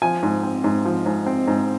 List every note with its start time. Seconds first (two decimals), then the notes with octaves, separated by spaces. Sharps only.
0.02 F3 G#5
0.23 G#2
0.43 C4
0.64 G#2
0.85 F3
1.06 G#2
1.26 C4
1.48 G#2